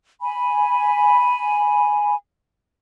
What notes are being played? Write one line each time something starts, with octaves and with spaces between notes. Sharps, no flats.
G#5 B5